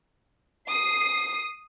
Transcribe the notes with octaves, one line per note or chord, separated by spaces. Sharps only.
D#6 C7